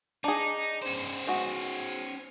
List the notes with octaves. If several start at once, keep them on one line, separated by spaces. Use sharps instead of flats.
D4 D#4 G#4
C#4 C5
G#3 F#4